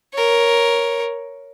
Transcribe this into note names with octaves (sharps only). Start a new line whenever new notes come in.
A#4 C#5